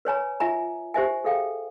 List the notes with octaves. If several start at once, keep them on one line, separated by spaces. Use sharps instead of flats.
B4 C#5 G#5 A#5
F4 E5 G#5 A#5
G4 C5 E5 G#5
G#4 A4 F5 G5